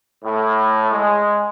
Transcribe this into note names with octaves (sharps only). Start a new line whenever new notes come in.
A2
G#3